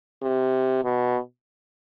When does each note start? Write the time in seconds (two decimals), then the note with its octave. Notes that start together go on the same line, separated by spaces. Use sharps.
0.22 C3
0.85 B2